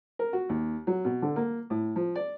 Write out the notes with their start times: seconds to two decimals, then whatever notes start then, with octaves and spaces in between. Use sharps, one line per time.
0.19 A#4
0.33 F#4
0.49 D#2
0.87 F#3
1.05 B2
1.22 D3
1.36 A#3
1.70 A2
1.96 F3
2.16 D5